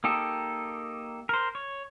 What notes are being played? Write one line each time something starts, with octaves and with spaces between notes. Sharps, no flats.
A#3 D#4 G4 A4
A#4 C5
C#5